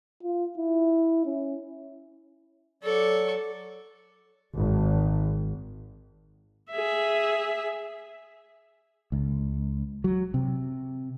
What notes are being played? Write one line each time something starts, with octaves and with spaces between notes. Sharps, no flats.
F4
E4
C#4
F#3 A4 D5 C#6
G#1
G#4 E5
C#2
F#3
C3